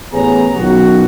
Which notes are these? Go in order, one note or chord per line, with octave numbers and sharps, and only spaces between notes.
A1 B3 G#4 C#5 A#5
B1 F#2 D#3 F4 F#4